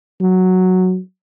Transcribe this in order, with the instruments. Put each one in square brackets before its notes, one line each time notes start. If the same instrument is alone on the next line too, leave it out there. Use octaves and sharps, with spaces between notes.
[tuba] F#3